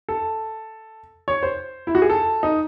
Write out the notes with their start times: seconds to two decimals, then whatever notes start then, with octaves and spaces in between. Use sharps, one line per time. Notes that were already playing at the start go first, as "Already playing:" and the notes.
0.09 A4
1.28 C#5
1.43 C5
1.87 E4
1.95 F#4
2.02 G#4
2.10 A4
2.43 D#4